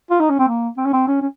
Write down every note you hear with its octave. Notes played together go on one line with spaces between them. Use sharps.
F4
D#4
C#4
C4
A#3
C4
C#4
C4
C#4
C#4